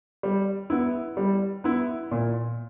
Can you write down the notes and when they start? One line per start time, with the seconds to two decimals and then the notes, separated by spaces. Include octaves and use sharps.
0.23 G3
0.70 B3 E4
1.17 G3
1.64 B3 E4
2.11 A#2